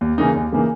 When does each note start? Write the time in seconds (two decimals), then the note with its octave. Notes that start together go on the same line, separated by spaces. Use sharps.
0.01 D#2
0.18 C#3 E3 A#3 D#4
0.35 D#2
0.52 C#3 E3 A#3 D#4